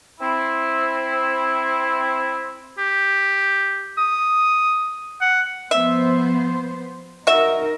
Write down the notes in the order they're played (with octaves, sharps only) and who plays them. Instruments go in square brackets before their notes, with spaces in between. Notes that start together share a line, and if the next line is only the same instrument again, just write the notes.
[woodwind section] C4 E4
[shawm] G4
D#6
F#5
[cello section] F3 B3 C5 [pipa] E5
[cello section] D#4 A#4 [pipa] F#4 E5